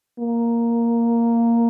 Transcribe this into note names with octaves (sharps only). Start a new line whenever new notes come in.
A#3